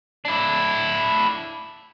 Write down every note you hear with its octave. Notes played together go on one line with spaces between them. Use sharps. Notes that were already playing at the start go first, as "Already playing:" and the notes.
D4 E4